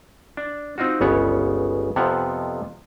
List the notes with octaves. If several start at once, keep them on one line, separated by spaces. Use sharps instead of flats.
D4
C4 D#4 F4 F#4
G1 C#2 C#3 B3 C#5 F#5
F2 C3 F3 B3 F#5